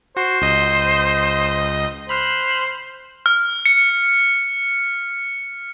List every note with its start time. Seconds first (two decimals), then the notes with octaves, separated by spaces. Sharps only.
0.17 F#4 C5
0.42 C#2 D#5
2.09 C5 B5 F6 F#6
3.26 F6
3.66 C#7